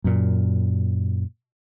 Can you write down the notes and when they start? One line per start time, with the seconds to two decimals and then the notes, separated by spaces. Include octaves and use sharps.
0.04 F#2 A#2